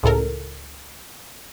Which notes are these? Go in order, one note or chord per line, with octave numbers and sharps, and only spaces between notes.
C#2 A2 A4 A#4